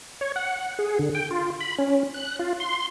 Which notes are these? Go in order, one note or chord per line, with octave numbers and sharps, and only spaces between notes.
C#5
F#5
G#4
D3
G5
F4
B5
C#4
F#6
F4
C6